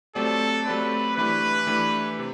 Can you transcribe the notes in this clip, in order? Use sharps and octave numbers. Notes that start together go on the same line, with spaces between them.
F#3 A3 C4 G4 A4 D5
F#3 A3 C4 G4 B4 D5
E3 A3 D4 G4 B4
E3 A3 D4 G4
C3